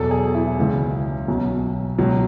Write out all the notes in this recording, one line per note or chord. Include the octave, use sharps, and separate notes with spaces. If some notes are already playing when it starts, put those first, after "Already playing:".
Already playing: E2 B2 F#3 A4
G#4
E4
C#2 C#3 E3
B1 B2 F#3
C#2 B2 F#3